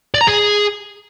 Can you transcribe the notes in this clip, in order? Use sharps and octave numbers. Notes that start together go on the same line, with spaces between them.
D5
A#5
G#4